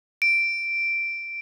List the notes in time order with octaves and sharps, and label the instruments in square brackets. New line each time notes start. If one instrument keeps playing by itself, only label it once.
[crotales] D7